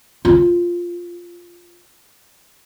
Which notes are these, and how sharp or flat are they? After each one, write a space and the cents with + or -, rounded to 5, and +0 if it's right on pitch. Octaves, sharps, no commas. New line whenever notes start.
F4 +0